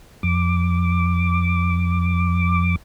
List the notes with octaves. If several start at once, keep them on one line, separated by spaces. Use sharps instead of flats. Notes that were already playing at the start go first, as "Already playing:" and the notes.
F2 D6